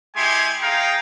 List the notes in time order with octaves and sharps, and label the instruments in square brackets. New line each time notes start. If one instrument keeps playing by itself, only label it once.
[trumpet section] G#3 E4 G4 G#5 C6
D#4 G#4 F5 G5 A#5